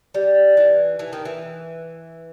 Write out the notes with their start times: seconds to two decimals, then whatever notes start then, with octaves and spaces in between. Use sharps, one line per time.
0.14 G3
0.57 E3
0.99 E3
1.13 D#3
1.25 E3